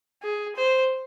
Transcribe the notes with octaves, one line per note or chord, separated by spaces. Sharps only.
G#4
C5